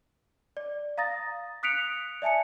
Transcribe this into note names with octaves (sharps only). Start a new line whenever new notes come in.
D5
F5 A#5 D#6 A6 A#6
D#6 F#6 B6 C#7 D7 F7
D5 E5 G#5 A5 C#7